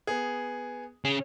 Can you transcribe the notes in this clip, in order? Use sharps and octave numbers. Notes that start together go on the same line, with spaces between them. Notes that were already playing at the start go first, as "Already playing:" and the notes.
B3 G#4
C#4 G#4